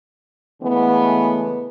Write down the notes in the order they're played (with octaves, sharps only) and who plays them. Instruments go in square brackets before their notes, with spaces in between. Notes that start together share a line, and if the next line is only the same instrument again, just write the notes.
[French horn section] C#3 E3 G#3 A3 B3